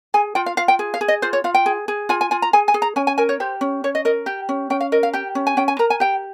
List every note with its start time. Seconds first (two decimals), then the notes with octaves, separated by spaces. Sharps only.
0.14 G#4 G#5
0.35 F4 G5
0.46 F5
0.57 F4 F5
0.68 G5
0.79 G#4
0.94 F5
1.01 G#4
1.08 D#5
1.22 F4 C5
1.33 C#5
1.44 F4 F5
1.54 G5
1.66 G#4
1.88 G#4
2.09 F4 G#5
2.21 G#5
2.31 F4 G#5
2.42 A#5
2.53 G#4 G#5
2.68 G#5
2.74 G#4
2.82 A#5
2.96 C#4 G#5
3.07 G#5
3.18 A#4 G#5
3.29 C#5
3.40 G4 C5
3.61 C#4
3.84 C#4 C#5
3.95 D#5
4.05 A#4 D#5
4.26 G4 G5
4.49 C#4
4.70 C#4 G5
4.81 F5
4.92 A#4 D#5
5.03 F5
5.13 G4 G5
5.35 C#4
5.47 G#5
5.57 C#4 G5
5.68 G#5
5.79 A#4 A#5
5.90 G#5
6.00 G4 G5